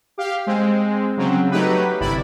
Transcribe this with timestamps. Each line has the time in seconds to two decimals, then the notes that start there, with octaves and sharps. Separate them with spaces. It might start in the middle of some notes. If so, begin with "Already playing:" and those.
0.18 G4 F5
0.47 G#3 C4
1.17 C#3 F#3 C4
1.51 F#3 A3 D#4 G4 B4
2.00 G1 C3 E4 D5 B5